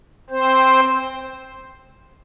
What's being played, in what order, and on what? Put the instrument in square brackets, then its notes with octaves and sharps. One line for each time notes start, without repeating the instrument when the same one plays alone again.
[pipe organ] C4 C5